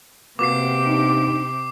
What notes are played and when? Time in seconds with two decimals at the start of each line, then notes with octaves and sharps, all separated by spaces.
0.39 C3 A#3 B3 F#4 G4 D6 C7
0.86 D4 D#4